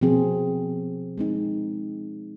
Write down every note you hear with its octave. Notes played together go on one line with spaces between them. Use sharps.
B2 F3 C4 G#4
G#3 C4 D#4